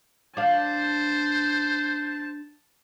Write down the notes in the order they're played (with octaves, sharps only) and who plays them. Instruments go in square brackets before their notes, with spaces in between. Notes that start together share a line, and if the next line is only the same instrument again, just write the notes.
[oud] D4 F5 [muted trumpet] C5 [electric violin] A5